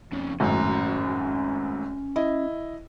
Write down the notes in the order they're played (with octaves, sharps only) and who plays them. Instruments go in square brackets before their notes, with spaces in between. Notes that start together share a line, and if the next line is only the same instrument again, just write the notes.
[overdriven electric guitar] F2 C#3
[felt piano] G#1 F#2 A2 [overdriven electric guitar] C#4 A#5
[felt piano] E4 D#5